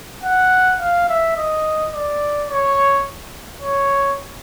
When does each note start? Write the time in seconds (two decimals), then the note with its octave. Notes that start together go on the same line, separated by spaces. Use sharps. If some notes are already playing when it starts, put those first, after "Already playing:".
0.24 F#5
0.80 F5
1.09 E5
1.37 D#5
1.93 D5
2.50 C#5
3.61 C#5